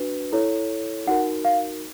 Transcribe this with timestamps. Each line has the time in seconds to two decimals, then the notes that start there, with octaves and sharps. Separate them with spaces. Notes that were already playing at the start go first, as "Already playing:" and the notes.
Already playing: D4 F#4 B4
0.32 E4 A4 C#5
1.07 D#4 F#4 A#4 F#5
1.45 F5